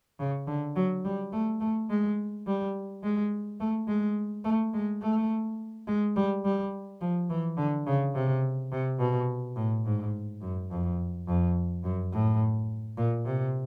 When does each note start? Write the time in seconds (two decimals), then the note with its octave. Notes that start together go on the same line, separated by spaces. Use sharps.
0.20 C#3
0.47 D3
0.76 F#3
1.05 G3
1.33 A3
1.60 A3
1.90 G#3
2.47 G3
3.03 G#3
3.60 A3
3.88 G#3
4.45 A3
4.74 G#3
5.02 A3
5.87 G#3
6.16 G3
6.44 G3
7.01 F3
7.30 E3
7.57 D3
7.87 C#3
8.15 C3
8.72 C3
8.99 B2
9.56 A2
9.85 G#2
10.41 F#2
10.71 F2
11.28 F2
11.84 F#2
12.12 A2
12.97 A#2
13.25 C3